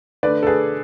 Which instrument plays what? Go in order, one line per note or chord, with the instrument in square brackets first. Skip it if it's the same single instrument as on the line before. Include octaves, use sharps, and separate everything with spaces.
[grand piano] D3 A3 B4 D5
A4
G#4 B4